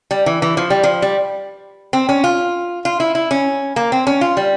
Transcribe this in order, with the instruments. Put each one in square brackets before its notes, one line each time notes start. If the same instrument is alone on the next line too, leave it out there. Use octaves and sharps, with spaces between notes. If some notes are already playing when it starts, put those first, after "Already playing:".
[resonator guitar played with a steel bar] G3
E3
E3
F3
G3
F3
G3
C4
C#4
F4
F4
E4
E4
C#4
A#3
C4
C#4
F4
G3